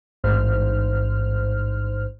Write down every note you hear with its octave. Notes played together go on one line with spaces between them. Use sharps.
A1 G#2 C5 F6